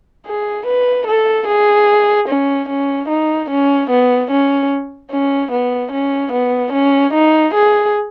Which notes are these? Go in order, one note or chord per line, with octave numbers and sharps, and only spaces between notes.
G#4
B4
A4
G#4
C#4
C#4
D#4
C#4
B3
C#4
C#4
B3
C#4
B3
C#4
D#4
G#4